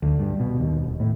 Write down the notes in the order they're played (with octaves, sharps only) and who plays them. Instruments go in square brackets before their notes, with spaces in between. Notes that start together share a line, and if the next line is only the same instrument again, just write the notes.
[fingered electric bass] D2
G2
B2
D#2
E1
A2